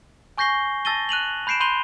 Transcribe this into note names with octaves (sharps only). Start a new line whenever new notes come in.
G#5 C#6 G6 A#6 C7 G7
A5 E6 A6 A#6 D#7 G7
F#6 D#7 F7 F#7
B5 G6 C7 D7 E7
B5 C6 G6 D#7 F7 G7